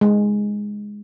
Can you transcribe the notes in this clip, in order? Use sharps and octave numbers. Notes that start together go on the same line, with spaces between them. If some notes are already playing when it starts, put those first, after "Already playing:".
G#3